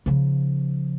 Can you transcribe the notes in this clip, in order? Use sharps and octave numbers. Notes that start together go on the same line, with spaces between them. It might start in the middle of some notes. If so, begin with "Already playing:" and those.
C#3 F3